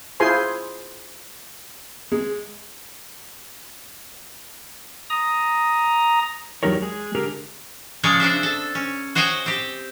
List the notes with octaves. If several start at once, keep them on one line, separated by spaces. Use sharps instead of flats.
E4 F4 G#4 C5 G#5 C6
G#3
A#5 D#6
E2 F#3 D#4 G4 A#4 C#5
G#3 G#4
D3 G4 G#4 A#4
C#3 F3 G#3 G#4 C#5 D5
C4 D4 C5 E5
A4
C#4
F#4 C5 C#5 D#5 G5 G#5
C4 G4